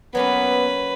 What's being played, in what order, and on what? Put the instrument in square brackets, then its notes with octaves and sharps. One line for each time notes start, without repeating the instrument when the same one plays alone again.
[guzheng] F#3 A#3 C#4 [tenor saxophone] B3 [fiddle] B4